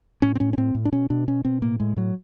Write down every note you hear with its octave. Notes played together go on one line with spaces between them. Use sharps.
A2 C#4
C4
A2 C#4
C#4
A2 C4
A2
D4
B2 C#4
B2 D4
B2 C#4
B2 C4
A2 A#3
A2 G#3
A2 F#3